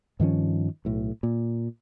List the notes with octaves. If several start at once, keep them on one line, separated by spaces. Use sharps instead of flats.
G2 D#3 F3 C#4
B1 A2
A#2